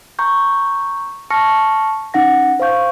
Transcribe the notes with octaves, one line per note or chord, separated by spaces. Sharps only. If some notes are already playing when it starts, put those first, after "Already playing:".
A#5 C#6 G6
A5 C#6 F6 A#6 C#7
C#4 D#4 F#5 A#6
C5 F5 C#6 G6